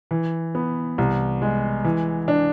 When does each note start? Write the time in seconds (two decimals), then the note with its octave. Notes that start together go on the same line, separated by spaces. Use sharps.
0.11 E3
0.55 B3
0.98 C2
1.42 G#3
1.84 E3
2.28 D4